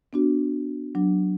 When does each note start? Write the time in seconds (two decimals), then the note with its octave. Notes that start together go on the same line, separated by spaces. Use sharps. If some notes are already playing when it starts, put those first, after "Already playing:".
0.13 B3 D4 F#4
0.95 F#3 D4